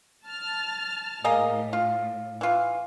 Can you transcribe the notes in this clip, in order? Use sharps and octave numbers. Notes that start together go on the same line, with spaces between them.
A5 F6
A2 A#3 G#4 D#5
F4
E3 F4